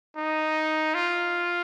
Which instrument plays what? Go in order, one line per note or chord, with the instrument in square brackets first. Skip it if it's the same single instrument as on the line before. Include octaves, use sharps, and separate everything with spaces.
[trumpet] D#4
F4